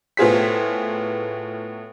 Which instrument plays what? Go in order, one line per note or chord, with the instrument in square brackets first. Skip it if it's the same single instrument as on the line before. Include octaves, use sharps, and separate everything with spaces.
[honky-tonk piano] A2 B3 F4 G#4 C5 B6